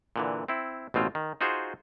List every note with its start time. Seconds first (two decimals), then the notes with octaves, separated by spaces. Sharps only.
0.16 A#2 D3 E3
0.48 C4 E4
0.94 A1 B2 C4 F4
1.15 D#3
1.41 D#4 F4 F#4 G#4 C5